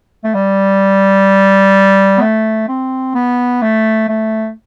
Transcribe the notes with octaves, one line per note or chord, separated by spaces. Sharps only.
A3
G3
B3
A3
C4
B3
A3
A3